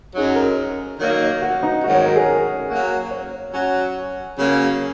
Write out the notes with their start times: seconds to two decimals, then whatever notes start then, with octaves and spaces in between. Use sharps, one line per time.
0.15 F#2 F#3 D#4 G#4
0.36 A#4
0.99 D#3 F#3 A#3 D#4
1.42 F#4
1.63 D#4
1.84 G#2 D#3 F#3 F#4
1.95 C#5
2.05 A#4
2.16 G#4
2.26 A#4
2.69 F#3 A#3 F#4
3.11 C#5
3.53 F#3 C#4 F#4
4.38 C#3 F#3 A#3 C#4